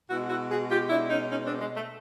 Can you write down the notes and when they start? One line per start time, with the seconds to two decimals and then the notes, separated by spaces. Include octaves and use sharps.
0.09 B2 G#3 E4 F#4
0.29 E4 F#4
0.50 F#4 G#4
0.70 F4 G4
0.89 D4 E4
1.09 C#4 D#4
1.29 C#4 D#4
1.44 C4 D4
1.59 G#3
1.75 A3